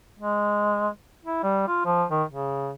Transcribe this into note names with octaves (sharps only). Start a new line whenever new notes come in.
G#3
E4
G3
F4
F3
D#3
C#3